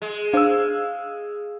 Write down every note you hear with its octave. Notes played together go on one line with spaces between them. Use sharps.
G#3
D4 C5 F5 E6